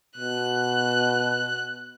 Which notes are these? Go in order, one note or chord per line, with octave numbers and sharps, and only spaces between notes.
B2 F#6